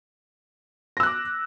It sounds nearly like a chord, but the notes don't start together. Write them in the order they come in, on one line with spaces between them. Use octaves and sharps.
A#6 E6 F#6 D6